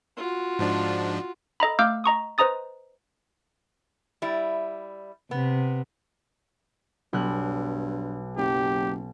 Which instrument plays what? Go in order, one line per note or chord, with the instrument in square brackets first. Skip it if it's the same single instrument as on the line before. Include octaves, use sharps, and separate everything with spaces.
[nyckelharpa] F4 F#4
[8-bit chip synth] G#2 F3 D4
[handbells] A4 D#5 A#5 B5
A3 F5 D6 E6 F6 G6
D#5 A#5 C#6 D#6
B4 C5 D#5 A#5 D#6 A6
[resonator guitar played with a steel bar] G3 E4
[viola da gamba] C3 [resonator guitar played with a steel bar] B3
[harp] B1 F#6 [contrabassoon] G2
[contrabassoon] F#1 [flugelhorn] G4